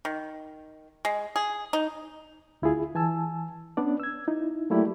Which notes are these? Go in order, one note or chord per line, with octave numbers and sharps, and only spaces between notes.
D#3
G#3
G#4
D#4
D2 E4 F4 G#4
E3 G#5 A5 E6
B3 C#4 D4 D5
E6 G#6
D#4 E4
F#3 A3 A#3 E4 G4 D5